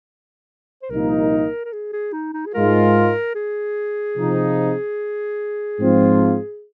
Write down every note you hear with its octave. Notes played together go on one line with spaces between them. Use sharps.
C5
C2 A#2 F3 A#3 D#4 A#4
A#4
G#4
G#4
D#4
D#4
G#4
G#2 G#3 F4 A#4
G#4
C3 F3 C4 D#4
G#2 F3 C4 F4